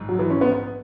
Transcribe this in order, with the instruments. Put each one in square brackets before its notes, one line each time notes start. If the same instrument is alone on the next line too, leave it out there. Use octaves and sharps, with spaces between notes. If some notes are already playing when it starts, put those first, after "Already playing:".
Already playing: [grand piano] A#1 G#2
[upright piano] F#3
E3
C#4
B3
B3